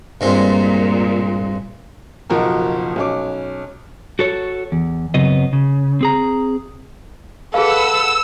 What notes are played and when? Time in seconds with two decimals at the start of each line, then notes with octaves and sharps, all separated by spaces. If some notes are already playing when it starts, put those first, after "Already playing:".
0.21 G2 A#2 G#3 C4
2.30 F#1 B1 F3 F#4 A#4
2.96 B1 C#4 D6
4.19 F#4 A4 C#5
4.72 E2
5.14 F#2 C#3 F#3 B3 C4 D#5
5.53 C#3
6.01 C4 G#4 A#5
7.54 G#4 A4 B4 F5 F#5 E6